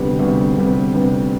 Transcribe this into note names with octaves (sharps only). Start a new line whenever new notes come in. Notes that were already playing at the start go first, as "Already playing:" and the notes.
Already playing: D2 C3 G3 B3
D2 C3 G3 B3
D2 C3 G3 B3
D2 C3 G3 B3